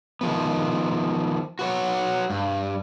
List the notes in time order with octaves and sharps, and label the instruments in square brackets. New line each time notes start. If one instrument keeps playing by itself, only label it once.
[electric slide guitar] D#3 F3 B3
F#4 B4 C#5
G2